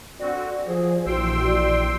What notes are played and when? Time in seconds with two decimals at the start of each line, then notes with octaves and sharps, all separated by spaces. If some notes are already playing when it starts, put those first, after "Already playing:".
0.20 D3 C4 F#4 D5
0.67 F3 G#4 C5
1.06 A#1 E3 F#4 G5 C6 E6
1.47 D5